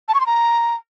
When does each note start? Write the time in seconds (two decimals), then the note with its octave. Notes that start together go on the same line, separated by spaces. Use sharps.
0.08 A5
0.14 C#6
0.20 C6
0.26 A#5